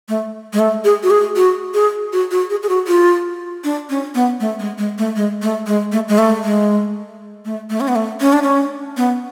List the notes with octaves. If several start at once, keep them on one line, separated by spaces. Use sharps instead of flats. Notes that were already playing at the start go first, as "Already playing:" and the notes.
A3
G#3
A3
G#4
F#4
G#4
F#4
G#4
F#4
F#4
G#4
G#4
F#4
F4
D4
C#4
B3
A3
G#3
G#3
A3
G#3
A3
G#3
A3
G#3
A3
G#3
A3
A3
C#4
B3
A3
C#4
D4
C#4
B3